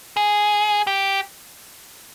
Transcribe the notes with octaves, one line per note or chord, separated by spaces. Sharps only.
G#4
G4